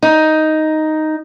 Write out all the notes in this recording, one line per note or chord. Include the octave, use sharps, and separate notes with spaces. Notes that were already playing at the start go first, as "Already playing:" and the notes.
D#4